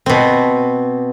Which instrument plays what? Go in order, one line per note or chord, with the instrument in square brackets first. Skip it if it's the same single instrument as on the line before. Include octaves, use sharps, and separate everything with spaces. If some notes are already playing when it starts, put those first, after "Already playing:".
[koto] B2 C4